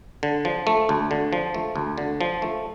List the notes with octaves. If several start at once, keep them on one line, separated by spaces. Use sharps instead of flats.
D3
F3
A3
D2
D3
F3
A3
D2
D3
F3
A3